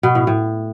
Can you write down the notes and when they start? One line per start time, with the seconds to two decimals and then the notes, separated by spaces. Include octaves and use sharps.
0.03 B2
0.15 A2
0.27 A2